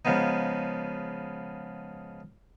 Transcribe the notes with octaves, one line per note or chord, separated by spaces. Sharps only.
C#3 F3 G#3 B3 D#4